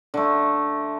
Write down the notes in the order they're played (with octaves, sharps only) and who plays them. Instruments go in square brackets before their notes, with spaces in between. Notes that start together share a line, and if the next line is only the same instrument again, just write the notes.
[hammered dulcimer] D3 A3